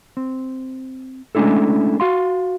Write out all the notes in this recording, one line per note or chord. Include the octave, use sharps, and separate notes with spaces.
C4
G#3 A3 C#4 D4 E4 A4
F#4 F5 C6